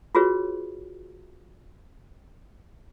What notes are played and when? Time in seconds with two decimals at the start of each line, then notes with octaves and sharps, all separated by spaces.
0.15 F4 F#4 G#4 B4 C#5